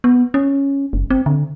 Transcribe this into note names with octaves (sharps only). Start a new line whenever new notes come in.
B3
C#4
F#1
C4
D3